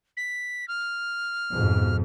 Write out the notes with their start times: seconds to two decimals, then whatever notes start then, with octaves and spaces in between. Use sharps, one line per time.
0.17 B6
0.68 F6
1.51 F2 G#2 B2